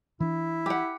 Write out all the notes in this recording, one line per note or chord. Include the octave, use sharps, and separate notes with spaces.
E3 D4 E4
G4 F#5